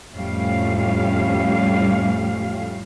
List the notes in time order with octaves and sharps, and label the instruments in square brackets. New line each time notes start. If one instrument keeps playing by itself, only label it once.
[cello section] F2 A2 G3 A3 C#4 F5